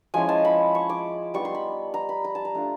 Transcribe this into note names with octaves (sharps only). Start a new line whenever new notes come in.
F3 G#3 C#4 E4 G#5
A5
B5
C#6
D6
G3 B3 D#4 C#6
C6
B5
A#5
B5
A#5
A5
A#5
A3 D4 F4